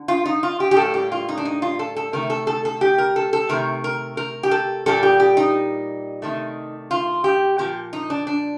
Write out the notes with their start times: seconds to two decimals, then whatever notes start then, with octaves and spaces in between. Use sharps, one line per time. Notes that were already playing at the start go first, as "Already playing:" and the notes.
Already playing: D3
0.08 F4
0.26 D#4
0.43 F4
0.60 G4
0.71 G4
0.77 A2 G3 A#3 A4
0.94 G4
1.12 F4
1.29 D#4
1.37 D4
1.45 D#4
1.62 F4
1.79 A4
1.96 A4
2.13 C3 D#3 A3 A#4
2.30 A4
2.47 A4
2.65 A4
2.81 G4
2.98 A#4
3.16 A4
3.33 A4
3.49 C3 D#3 A3 A#4
3.84 A#4
4.17 A#4
4.43 G4
4.51 A4
4.86 A#2 G3 A#3 A4
5.03 G4
5.20 G4
5.37 D#4
6.22 C3 D#3 A3
6.91 F4
7.24 G4
7.58 A#2 F3 A#3 G4
7.93 D#4
8.10 D4
8.27 D4